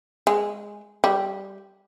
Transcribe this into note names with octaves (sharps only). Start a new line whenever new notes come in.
G#3
G3